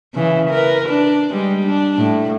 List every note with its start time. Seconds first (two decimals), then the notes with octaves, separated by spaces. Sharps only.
0.14 C#3 E3
0.50 A#4 B4
0.89 D4
1.31 G3 G#3
1.67 D4
1.97 A2